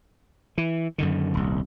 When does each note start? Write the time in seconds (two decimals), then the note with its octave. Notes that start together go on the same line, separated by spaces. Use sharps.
0.58 E3
0.98 F#2 D3 D#3
1.34 D#1 C2